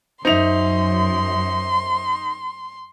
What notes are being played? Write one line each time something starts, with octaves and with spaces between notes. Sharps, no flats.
F#2 D#4 C5 E5 C6 F7